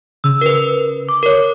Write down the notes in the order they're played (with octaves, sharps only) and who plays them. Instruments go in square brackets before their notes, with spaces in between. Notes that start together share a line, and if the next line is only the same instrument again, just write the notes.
[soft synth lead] C#3 [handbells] E6
[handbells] A#4 B4
D6
A#4 C#5